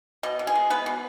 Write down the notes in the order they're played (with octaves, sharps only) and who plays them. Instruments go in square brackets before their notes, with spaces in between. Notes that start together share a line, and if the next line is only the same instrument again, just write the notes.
[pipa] B2 D#5
B2
G#4
G#3
B3 B4
B2